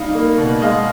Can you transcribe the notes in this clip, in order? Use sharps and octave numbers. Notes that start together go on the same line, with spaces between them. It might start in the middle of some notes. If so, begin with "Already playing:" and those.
Already playing: G3 D#4 D#5 F5
A#3
B2
G#3 D#5 F5